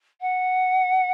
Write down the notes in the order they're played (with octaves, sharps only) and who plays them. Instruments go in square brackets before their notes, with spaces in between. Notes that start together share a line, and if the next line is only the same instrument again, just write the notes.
[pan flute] F#5